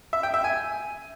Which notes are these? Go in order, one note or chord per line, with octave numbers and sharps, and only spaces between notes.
E5
G5
E5
G#5